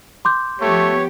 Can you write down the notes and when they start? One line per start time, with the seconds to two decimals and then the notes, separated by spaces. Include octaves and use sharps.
0.25 C6 D6 G6
0.61 F3 A3 B3 G4 C#5